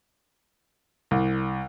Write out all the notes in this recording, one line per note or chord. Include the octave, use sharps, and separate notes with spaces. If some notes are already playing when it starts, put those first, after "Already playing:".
C2